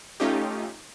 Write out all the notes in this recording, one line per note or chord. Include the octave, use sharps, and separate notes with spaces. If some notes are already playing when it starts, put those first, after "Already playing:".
A3 C#4 D#4 F4 G4